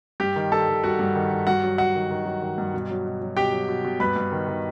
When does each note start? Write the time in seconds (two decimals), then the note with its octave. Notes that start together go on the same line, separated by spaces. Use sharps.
0.20 G2 G4 G5
0.36 D#3
0.52 G3 A4 A5
0.68 D#3
0.84 G3 F#4 F#5
0.99 G2
1.15 D#3
1.31 D#3
1.47 G2 F#4 F#5
1.63 F#3
1.78 G2 F#4 F#5
1.95 D#3
2.11 D#3
2.26 F#3
2.42 D#3
2.58 G2
2.74 B2
2.90 F#3
3.06 B2
3.22 F#3
3.37 B2 G4 G5
3.52 F#3
3.69 B2
3.84 B2
4.00 G2 B4 B5
4.16 G2
4.32 D#3
4.48 D#3